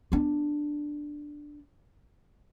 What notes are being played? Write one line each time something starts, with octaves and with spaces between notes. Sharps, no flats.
B3 D4